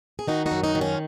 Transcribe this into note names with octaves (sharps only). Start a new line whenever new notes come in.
G#4
D#3 D#4 F#4
D#4 F#4
F#2
D#4 F#4
D#3
C#4 F4